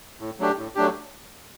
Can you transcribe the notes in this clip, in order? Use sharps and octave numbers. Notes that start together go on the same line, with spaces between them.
A2
F#3 A3 D4 G4
A2
F#3 A3 D4 G4